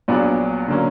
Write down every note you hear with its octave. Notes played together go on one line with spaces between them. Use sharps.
A#1 A#2 F#3 B3 D4 D5
D3 F#3 A#3 C#4